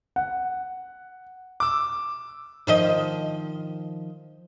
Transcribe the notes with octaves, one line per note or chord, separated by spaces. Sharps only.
F#5
D6 E6
D#3 F3 D#5